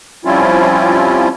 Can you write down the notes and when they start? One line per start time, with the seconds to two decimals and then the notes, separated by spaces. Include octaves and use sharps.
0.25 F3 G3 C4 C#4 E4 F4